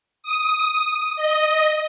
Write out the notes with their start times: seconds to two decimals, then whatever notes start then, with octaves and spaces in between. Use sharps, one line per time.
0.23 D#6
1.16 D#5